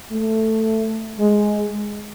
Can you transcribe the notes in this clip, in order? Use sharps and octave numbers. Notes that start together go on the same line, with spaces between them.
A3
G#3